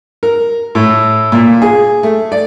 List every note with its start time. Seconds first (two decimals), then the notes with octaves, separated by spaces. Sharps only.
0.23 A#4
0.75 A2
1.32 A#2
1.62 G#4
2.03 A3
2.32 D5